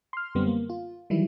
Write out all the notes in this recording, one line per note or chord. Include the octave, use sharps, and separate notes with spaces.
C6 F6
F#2 D3 G3 B3 C4
A#3
F4
D#3 E3 F#3 G3 E4